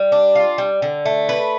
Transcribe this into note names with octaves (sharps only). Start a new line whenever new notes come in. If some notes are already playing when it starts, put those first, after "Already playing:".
Already playing: G3
D4
F4
G3
D3
A3
B4